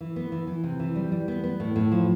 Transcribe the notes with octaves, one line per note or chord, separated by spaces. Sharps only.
E3
B3
E3
E3
C3
E3
G3
G3
B3
B3
A2
A2
F3